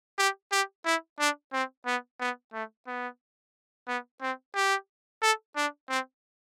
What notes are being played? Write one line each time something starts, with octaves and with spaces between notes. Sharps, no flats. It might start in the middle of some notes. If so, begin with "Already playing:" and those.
G4
G4
E4
D4
C4
B3
B3
A3
B3
B3
C4
G4
A4
D4
C4